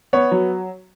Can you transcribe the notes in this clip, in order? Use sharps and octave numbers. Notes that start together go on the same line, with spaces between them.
B3 C#5
F#3